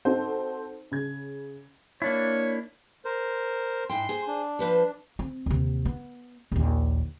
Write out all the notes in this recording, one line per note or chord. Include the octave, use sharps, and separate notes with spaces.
C4 D#4 F#4 A4 C5
C#3 G#6
A#3 D4 E4 C#5
A#4 C5
G#2 E4 G5 C6
G#4 C5
D4
F3 B4 C5
C4
D#2 C3
B3
A#1 D#2